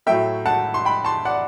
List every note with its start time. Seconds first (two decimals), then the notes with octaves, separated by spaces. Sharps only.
0.06 A2 F#3 A3 E5 G5
0.46 F#5 A5
0.74 C6
0.85 G5 B5
1.05 A5 C6
1.25 D5 F#5